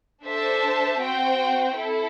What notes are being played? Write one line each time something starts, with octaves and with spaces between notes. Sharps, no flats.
D4 A4 C5 E5 A5
C4 F#4 C5 G5
E4 A4